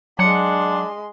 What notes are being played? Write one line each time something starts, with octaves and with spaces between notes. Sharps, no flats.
F#3 G#3 D4 F#5 C6